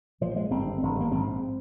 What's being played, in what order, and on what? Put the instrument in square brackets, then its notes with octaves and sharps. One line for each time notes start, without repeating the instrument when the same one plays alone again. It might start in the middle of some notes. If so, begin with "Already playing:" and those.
[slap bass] A#1 A#2 F3
G#3
G#1 G2 D3 C4
G#1 G2 D3
A#3
A#1 G#2 C4